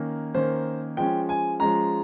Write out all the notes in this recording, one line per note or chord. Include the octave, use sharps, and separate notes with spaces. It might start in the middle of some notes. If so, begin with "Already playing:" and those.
Already playing: D#3 A#3 C#4
D#3 A#3 C#4 C5
F3 G#3 C#4 G5
G#5
F3 G#3 C#4 A#5